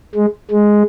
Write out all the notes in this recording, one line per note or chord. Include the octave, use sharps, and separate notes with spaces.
G#3
G#3